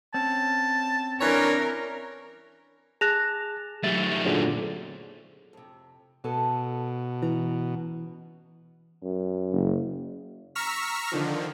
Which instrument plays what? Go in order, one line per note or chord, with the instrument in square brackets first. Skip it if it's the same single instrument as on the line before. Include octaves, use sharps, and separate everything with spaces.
[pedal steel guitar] C4 C#4 [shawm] A5
[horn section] E3 D4 C#5 [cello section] A#4
[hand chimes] G#4 [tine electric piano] A5 [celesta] F#6 A#6 F7
[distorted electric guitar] F#2 A3 [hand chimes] G4 E5 [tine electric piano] A6
[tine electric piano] A#2 D3 F#3 [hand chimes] G#4 A4 C5
[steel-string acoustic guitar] F2 C3
[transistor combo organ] B2 [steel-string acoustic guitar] A4 G#5 A5
[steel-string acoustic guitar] D2 C#4 A#5 [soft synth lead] E3
[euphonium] F#2
[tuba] F#1
[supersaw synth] A#5 C#6 E6 F6 B6
D3 D#3 F3